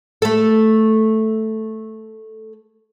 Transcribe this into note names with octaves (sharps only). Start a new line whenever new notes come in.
A3 A4